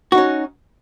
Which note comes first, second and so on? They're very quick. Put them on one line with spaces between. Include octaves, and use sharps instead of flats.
F#4 D#4 C#4